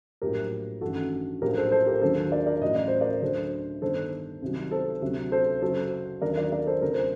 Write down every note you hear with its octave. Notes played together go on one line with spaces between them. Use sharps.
A#1 A2 F#3 G4 A#4
A1 G2 D#3 F#4 A4
A#1 A2 F#3 G4 A#4
A4 C5
A4 C5
G4 A#4
D#2 D3 F#3 A4 C5
A#4 D5
A#4 D5
A1 A2 F#3 D#5
D5
C5
A#4 D5
D2 D3 F#3 A4 C5
G1 G2 D#3 A4 C5
C2 C3 D#3 F#3
A4 C5
D2 C3 F#3
A4 C5
F#1 F#2 F#3 A4 C5
D#2 D3 F#3 A#4 D5
A#4 D5
A#4 D5
A4 C5
D2 C3 F#3 A#4
C5